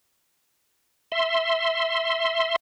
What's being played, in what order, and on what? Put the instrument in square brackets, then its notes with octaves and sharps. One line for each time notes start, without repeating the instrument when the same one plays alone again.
[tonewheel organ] E5 C6